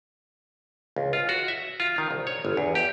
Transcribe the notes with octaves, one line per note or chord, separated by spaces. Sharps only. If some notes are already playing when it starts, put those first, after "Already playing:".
C#2
F4
F#4
E5
F4
D#3
C2
C#5
G1
E2
G4